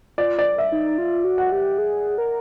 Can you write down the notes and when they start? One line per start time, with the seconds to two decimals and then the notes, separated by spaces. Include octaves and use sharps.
0.18 F4 D5
0.39 D5
0.58 E5
0.72 D#4
0.98 F4
1.24 F#4
1.38 F#5
1.52 G4
1.78 G#4
2.18 A#4